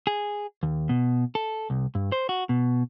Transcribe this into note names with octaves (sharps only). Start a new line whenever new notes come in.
G#4
D#2
B2
A4
C2
G2
C5
F#4
B2